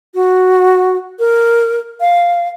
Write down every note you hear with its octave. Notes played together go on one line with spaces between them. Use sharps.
F#4
A#4
F5